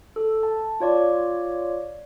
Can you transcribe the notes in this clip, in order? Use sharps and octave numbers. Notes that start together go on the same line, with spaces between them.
A4
A5
F4 C#5 D5